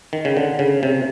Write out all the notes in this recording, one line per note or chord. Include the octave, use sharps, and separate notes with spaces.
D#3
C#3
D3
C#3
C3